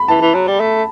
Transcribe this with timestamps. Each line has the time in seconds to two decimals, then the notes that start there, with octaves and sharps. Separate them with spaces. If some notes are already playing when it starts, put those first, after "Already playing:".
Already playing: B5
0.08 E3 A5
0.21 E3
0.34 F#3
0.47 G3
0.60 A3